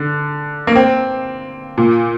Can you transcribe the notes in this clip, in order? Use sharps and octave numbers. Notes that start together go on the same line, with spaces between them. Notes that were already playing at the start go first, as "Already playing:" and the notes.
Already playing: D3
A#3
C4
A#2